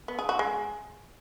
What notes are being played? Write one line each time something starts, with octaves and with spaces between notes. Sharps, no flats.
B3
G#4
F#4
G#3